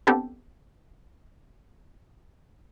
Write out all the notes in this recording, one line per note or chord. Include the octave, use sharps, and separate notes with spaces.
B3 C4 D4 G4 A4